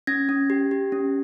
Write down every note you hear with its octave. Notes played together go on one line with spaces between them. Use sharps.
C#4 G#6 A#6
C#4
G4
G4
C#4